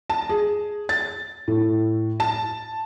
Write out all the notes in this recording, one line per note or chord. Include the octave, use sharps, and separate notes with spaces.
A5
G#4
A6
A2
A5